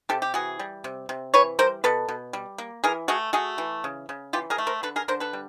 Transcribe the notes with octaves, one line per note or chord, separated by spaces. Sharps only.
C3 G4 A4
G4
E3 F#4 G#4
G3
C3
C3
E3 B4 C#5
G3 A#4 C5
B2 A4 B4
B2
G3
A#3
E3 G#4 A#4
A3 F#4 G#4
A3 F#4 G#4
E3
C#3
C#3
E3 F4 G4
G#4 A#4
A3
A#4 C5
D3 A4 B4
G#4 A#4
D3 A#4 C5
A4 B4
G3